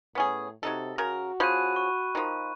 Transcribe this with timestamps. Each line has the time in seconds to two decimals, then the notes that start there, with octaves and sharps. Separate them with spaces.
0.15 A2 B3 C#4 G#4
0.63 C3 F#3 D#4 A4
0.98 C#3 F#4 A#4
1.40 F3 C#4 G#4 B5 F#6 D#7
1.76 C#6
2.15 D#3 F3